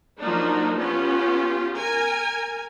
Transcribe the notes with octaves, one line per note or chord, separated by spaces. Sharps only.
F3 F#3 A#3 D4 D#4
B3 C#4 F4 G4
A#4 G#5